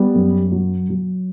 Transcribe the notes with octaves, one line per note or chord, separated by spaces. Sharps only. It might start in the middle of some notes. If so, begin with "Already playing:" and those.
Already playing: G3 B3
F#2
F#3
F#3